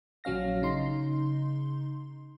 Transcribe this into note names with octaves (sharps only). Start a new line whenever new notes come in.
A#1 F#3 C#4 F5 A#6
C#3 D#4 C6